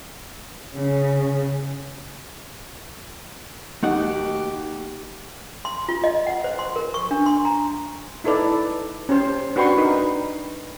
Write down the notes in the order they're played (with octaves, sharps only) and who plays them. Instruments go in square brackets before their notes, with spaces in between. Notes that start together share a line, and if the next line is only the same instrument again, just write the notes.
[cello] C#3
[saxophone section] D#2 F#4 G4 [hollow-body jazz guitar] A3 D#4 F#5
[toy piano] C6
F4
D#5
F#5
C5
C6
A#4
C#6
D4
C6
A#5
[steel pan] D#4 E4 A4 B4 D5
C#4 G4 C5
D4 F#4 B4 G5 C6 C#6
D#4 A#4 B4